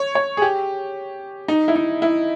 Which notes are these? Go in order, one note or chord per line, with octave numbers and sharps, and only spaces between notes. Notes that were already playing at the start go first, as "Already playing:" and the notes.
Already playing: C#5
C#5
G#4
G4
D#4
E4
D#4
E4